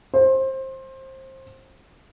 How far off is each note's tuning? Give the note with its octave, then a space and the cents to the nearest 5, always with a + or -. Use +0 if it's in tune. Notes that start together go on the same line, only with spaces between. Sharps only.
C5 +20